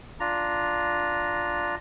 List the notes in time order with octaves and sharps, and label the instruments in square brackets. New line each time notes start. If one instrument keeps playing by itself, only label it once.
[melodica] D4 F4 A#5